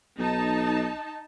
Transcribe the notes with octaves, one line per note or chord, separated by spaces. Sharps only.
B1 D#4 A5